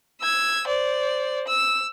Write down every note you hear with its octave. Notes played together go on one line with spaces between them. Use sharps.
E6 G#6
C5 D5
E6